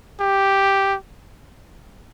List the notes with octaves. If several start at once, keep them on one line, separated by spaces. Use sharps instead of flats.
G4